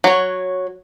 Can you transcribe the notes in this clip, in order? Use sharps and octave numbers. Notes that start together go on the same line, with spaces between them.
F#3 C#5